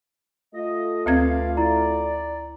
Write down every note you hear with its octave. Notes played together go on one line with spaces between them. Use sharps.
A3 F4 D#5
D2 C4 B4 D5 F5 G#6
E4 D5 A#5